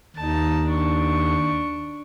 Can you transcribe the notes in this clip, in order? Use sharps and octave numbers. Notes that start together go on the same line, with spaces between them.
D#2 D#4 A5
D4 C#6